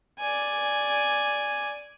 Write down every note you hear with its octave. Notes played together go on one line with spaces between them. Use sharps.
D5 G#5